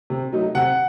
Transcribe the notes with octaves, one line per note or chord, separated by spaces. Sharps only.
C3
F#3 A3 D#4
C3 F#5